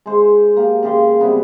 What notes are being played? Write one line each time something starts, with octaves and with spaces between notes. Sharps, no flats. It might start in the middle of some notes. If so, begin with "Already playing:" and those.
G#3 C5
A#3 G4
C#3 G4 F5 C6
C3 G3 B3 E4